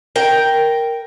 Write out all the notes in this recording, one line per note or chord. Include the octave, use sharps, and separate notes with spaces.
A#4 G5